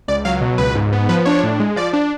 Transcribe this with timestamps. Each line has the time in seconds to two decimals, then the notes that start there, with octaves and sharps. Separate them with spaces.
0.08 C#2 D5
0.25 F#3 F5
0.41 B2
0.58 C#2 B4
0.75 G#2
0.92 B3
1.09 F3 B4
1.25 D4 C#5
1.43 A2
1.60 G#3
1.76 F3 D5
1.93 D4